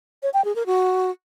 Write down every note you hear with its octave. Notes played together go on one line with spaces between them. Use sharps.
C#5
G5
G#4
A#4
F#4